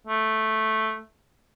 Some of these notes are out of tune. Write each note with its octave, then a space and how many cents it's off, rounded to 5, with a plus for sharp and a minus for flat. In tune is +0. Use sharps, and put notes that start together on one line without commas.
A3 -5